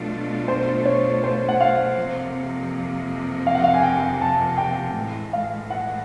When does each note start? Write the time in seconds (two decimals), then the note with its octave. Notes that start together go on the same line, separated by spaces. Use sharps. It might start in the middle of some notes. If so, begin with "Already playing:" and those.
Already playing: B2 F#3 A3 D4 F4
0.48 C5
0.86 C#5
1.24 C5
1.49 F#5
1.61 F5
1.97 F2 C3 F3 A#3
3.47 F5
3.55 F#5
3.64 F5
3.74 G#5
3.83 G5
4.21 A5
4.58 G5
4.96 A2 E3 G#3
5.33 F5
5.70 F#5